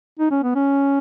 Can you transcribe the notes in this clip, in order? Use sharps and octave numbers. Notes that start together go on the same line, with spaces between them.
D#4
C#4
B3
C#4